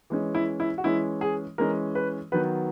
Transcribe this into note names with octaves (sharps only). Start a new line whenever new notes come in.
E3 G#3 C#4
E4
E4
F#4
E3 G#3 C#4 E4
G#4
E3 G#3 C#4 A#4
B4
D#3 F#3 B3 B4